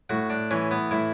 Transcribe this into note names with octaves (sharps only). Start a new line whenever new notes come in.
A2 F#4
D4
E3 C#4
B3
A2 E4